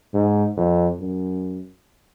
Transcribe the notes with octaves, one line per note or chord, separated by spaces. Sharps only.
G#2
F2
F#2